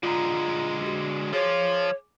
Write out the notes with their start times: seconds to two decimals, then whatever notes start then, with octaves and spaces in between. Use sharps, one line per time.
0.03 D3 G#3 F4 A#5
0.83 F#4 G4
1.33 F3 F4 G#4 C#5 D6